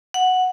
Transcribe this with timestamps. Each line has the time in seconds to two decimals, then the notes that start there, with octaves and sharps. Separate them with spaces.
0.14 F#5